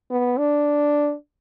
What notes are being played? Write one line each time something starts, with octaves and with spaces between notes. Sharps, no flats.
B3
D4